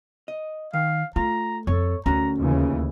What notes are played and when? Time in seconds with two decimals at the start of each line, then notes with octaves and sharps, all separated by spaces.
0.28 D#5
0.73 D#3 F5
1.16 A3 F4 A#5
1.67 F2 A4 C#5
2.06 D2 C#4 F#4 A#5
2.40 D#2 C#3 E3 F4